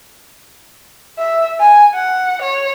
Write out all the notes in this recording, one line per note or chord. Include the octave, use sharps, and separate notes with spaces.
E5
G#5
F#5
C#5